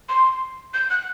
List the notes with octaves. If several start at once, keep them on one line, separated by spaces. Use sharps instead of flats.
C6
G6
F#6